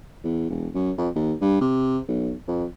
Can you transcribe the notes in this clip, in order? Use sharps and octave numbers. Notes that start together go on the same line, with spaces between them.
E2
E1
F#2
F2
D#2
G2
C3
B1
F2